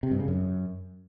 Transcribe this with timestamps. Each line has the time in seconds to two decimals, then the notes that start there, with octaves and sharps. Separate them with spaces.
0.03 C3
0.11 G2
0.20 C#3
0.28 F#2